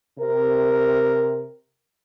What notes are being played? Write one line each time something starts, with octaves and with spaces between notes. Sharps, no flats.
C3 A#4